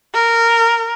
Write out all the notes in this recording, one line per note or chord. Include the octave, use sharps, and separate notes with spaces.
A#4